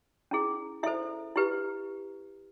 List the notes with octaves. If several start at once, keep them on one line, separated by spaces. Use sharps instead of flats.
C#4 E4 G#4
E4 A4 C5 E5
E4 G4 B4